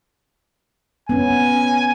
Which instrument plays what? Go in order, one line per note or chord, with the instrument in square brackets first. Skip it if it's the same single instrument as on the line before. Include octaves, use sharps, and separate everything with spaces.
[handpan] B3 C#4 [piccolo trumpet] G#5